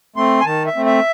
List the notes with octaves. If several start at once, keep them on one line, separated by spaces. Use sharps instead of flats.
A3 C4 C6
G#5
D#3 A5
E5
A3 C4
E5